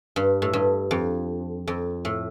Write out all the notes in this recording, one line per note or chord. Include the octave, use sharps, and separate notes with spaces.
G2
A2
G2
F2
F2
A2